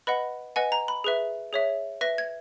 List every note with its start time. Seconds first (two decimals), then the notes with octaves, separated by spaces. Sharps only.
0.07 B4 D#5 F#5 B5
0.56 B4 D#5 F#5 G#5
0.72 A#5
0.88 B5
1.04 G#4 B4 E5
1.53 G#4 C#5 E5
2.01 B4 E5 A#6
2.18 G#6